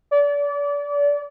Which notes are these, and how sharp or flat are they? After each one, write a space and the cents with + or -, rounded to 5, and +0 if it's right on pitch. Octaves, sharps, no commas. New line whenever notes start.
D5 -30